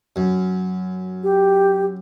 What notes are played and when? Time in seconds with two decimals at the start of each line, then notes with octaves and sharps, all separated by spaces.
0.16 F#2
1.23 G4